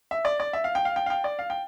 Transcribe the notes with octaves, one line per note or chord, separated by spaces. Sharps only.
E5
D5
D5
E5
F5
G5
F5
G5
F5
G5
D5
F5
G5